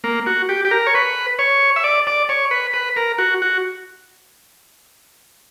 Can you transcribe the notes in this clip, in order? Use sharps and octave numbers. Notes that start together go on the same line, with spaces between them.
A#3
F#4
G4
G4
A#4
C#5
B4
C#5
E5
D5
D5
C#5
B4
B4
A#4
F#4
F#4